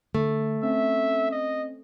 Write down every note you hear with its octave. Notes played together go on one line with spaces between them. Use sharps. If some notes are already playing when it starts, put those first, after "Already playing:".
D3 A3
C4 C#4 E5
D#5